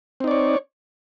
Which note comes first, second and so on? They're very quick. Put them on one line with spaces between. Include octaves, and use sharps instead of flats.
C4 D#4 D5 C#5